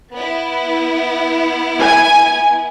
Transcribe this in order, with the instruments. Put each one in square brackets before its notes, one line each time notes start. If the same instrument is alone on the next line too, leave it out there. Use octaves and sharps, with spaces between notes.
[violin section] B3 E4
[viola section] G#5